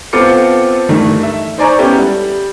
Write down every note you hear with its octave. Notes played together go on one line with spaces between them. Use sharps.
B3 C4 F4 A4 D6 C#7
G2 D#3 E3 A3
E5
D#4 C5 D5 G#5 A#5 C#6
B3 C#4 E4 G4 A4
G3